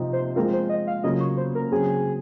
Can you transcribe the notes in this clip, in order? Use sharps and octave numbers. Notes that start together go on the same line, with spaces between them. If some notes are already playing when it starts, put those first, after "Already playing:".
Already playing: C3 F3 C4 D#4
C5
F3 G#3 C4 F4 A#4
C5
D#5
F5
C#3 F#3 A#3 C#4 F4 D#5
C#5
C5
A#4
C#3 F#3 C4 G#4